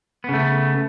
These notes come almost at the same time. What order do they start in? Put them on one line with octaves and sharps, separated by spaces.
B3 C#3 A3